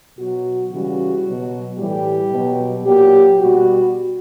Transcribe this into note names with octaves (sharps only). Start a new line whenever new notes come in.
B2 F#3 F#4
C#3 E3 G3 F#4
B2 F#3
A2 E3 G3 G4
B2 F#3
A#2 F#3 G4
B2 G3 F#4